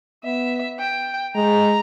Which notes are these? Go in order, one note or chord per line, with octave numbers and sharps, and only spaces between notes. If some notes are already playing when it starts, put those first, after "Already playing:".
B3 E5
G5
G#3 A#5